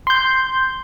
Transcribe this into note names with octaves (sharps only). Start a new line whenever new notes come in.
C6 G6